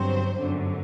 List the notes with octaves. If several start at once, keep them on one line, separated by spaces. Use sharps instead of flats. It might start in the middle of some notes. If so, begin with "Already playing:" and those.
Already playing: G1 G2 F#3 C4 C5
G1 F#2 D3